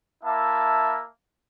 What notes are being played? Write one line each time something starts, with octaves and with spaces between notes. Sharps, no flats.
A#3 E4 E5 A5